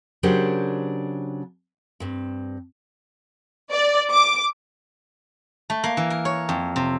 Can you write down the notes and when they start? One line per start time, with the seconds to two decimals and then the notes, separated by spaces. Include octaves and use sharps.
0.23 C#3 F#3 D4 G4 A#4 C5
2.00 G2 C4
3.72 D5
4.11 D6
5.70 A3
5.84 A#3
5.97 E3
6.10 A#4
6.25 C#5
6.49 F2
6.76 C3